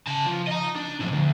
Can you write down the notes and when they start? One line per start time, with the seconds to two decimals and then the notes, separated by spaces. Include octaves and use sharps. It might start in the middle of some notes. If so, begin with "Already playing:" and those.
0.07 C#3 A5
0.27 F3
0.48 D#5 A#5
0.76 D4
1.01 A2 F3
1.12 D2